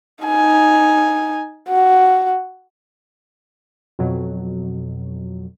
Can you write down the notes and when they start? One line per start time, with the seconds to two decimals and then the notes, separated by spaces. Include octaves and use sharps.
0.25 D#4 G#5
1.70 F#4
3.99 F2 B2 F#3